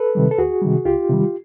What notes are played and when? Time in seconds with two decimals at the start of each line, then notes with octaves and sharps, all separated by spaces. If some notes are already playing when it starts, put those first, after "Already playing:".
Already playing: A4 B4
0.15 C3 D#3 G3
0.31 A4
0.38 D2 F#4 G#4
0.62 C3 D#3 G3
0.85 C#2 F4 G4
1.10 C3 D#3 G3